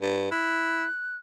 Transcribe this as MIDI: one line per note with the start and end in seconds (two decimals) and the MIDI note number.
0.02 0.28 43
0.31 0.85 64
0.31 1.16 90